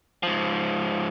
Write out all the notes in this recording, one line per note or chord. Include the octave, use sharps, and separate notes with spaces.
G#2 F3